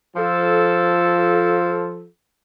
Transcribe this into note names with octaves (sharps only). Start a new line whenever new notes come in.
F3 A4